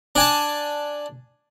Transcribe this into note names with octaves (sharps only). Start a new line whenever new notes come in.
D4 G#5 A5